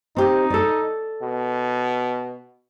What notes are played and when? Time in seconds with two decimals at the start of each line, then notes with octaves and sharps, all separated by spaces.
0.17 C4 D#4 G4
0.50 A4 D5
1.22 B2